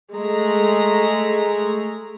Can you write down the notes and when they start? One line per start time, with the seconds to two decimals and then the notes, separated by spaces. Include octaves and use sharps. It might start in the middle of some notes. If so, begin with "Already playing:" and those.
0.14 G#3 A3 A#5